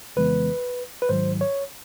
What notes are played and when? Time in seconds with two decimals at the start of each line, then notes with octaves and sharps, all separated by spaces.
0.16 F2 C#3 E3 G#3 B3 B4
1.02 B4
1.09 G#2 D#3 F#3 C5
1.41 C#5